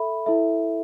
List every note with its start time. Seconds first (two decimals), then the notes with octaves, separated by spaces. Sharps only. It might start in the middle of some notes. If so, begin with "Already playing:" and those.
Already playing: A4 E5 B5
0.26 E4 A4 E5